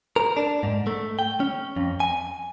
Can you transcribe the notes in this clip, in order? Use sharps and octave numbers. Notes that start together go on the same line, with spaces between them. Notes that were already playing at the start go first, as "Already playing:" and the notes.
A#4
D4
G#2
A3
G5
C#4
F2
G#5